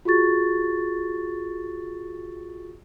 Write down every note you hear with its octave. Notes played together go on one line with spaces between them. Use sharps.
F4 F#4 G#4 C#6 A6